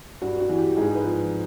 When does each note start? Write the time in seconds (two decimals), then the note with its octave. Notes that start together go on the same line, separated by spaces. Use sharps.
0.22 G2 F#4
0.40 F#4
0.49 E3
0.58 G4
0.76 G#2 G#4
0.95 B4
1.04 F3